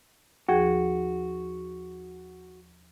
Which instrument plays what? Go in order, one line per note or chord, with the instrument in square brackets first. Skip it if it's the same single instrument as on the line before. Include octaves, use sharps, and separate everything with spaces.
[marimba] D#2 F3 G#4 [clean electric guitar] F#4